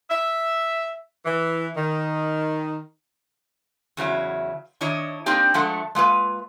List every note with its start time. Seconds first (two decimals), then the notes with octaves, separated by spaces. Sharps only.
0.10 E5
1.25 E3
1.76 D#3
3.97 E2 C#3 F#3 E4
4.81 D#3 D4 E4 C#5 D#5
5.26 A#3 C4 D4 D#4 G4
5.54 F3 G#3 A3 D4 A4 F#5
5.95 G#3 A#3 F4 B4